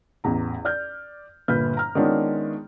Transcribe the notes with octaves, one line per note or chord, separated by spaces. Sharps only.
A1 E2 A#5
D5 F6 G6
G1 A#2 B4 F6 G6
A#5 F6
D#3 G#3 B3 C#4 D4 F4